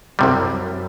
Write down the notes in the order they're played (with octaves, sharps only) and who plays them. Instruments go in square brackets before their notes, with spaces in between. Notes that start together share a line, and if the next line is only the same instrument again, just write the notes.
[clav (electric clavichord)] C2 C3 G3 [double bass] F#2